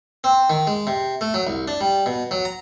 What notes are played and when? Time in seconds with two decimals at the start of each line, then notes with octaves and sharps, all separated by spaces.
0.24 C4
0.50 D#3
0.67 G#3
0.87 C3
1.21 A3
1.34 F#3
1.47 C2
1.68 D4
1.81 G3
2.06 B2
2.31 F#3
2.45 A#5